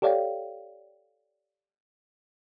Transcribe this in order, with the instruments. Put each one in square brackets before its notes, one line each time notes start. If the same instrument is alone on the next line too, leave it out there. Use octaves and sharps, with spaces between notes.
[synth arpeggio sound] G4 A4 C#5 D5 F5 G5